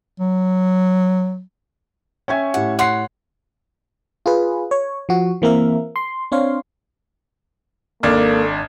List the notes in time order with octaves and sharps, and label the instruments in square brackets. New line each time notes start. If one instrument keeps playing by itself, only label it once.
[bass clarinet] F#3
[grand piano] C#4 E5 G#5 [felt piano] G5 C#6 G#6
[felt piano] A2 G4 [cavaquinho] F#5
[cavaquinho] C#5 F#5 C6 [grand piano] F#6 C7
[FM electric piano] F4 G#4 B4
C#5
F3 F#4
E3 A#3 C4 A#4 E5
C6
C4 D4 C#5 F5 C6
[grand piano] G#1 D4 F6 [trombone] A#3 [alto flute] A4